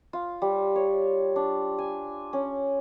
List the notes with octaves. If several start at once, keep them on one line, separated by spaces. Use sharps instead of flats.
F4
G3
C#5
D4
G#5
C#4